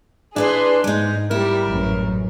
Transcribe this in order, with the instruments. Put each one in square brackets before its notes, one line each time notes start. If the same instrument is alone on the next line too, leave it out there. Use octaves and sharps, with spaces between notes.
[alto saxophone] D4 [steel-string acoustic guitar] E4 B4 D5 [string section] G#4 C6
[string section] G#2 [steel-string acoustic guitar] G#3 D#4
[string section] G3 [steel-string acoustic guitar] E4 [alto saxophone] A#4
[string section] A1 F#2